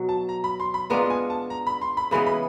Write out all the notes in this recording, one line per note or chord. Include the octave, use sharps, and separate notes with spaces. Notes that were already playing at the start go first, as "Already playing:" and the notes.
Already playing: B2 F#3
A5
A#5
B5
C6
B5
G#3 B3 D4 F4 A#5
G#5
A5
A#5
B5
C6
B5
C#3 E3 G#3 B3 B5
B5